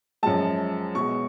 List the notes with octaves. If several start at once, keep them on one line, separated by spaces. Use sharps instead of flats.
F#2 F3 G#3 A5
B2 G#3 C#6